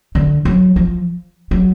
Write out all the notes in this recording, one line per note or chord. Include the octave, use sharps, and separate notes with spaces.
D3
F#3
F3
F#3